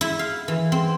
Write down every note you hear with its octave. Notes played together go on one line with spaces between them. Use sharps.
E4
F5
E3
C4